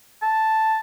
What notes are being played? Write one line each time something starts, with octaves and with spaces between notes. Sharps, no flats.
A5